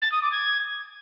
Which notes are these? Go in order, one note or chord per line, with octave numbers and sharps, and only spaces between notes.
A6
D#6
D6
G#6